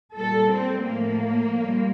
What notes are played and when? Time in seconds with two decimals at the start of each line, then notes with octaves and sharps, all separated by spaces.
0.15 A#2 G3 A4
0.50 C4
0.85 A2 F3 A3 A#3
1.56 A#2 G3